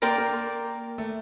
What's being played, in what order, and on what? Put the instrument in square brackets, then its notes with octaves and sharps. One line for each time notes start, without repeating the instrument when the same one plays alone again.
[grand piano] A#3 [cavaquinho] A#4 D5 G5 C6
[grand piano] A#3
A3